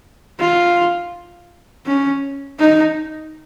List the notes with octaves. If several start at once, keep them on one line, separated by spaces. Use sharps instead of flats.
F4
C#4
D#4